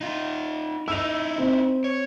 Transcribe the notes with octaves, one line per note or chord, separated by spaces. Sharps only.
D#4 F4
D#4 E4 E6 F7
C4
C#5